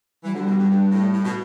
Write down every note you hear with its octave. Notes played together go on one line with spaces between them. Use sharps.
E3 G3
F#3
D3 G3
B2
G2
G2
A2
A2
B2